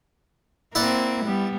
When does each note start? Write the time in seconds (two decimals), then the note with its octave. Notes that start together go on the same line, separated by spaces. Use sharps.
0.75 A#3 C4 E4 D5 F#5
1.24 G3 B3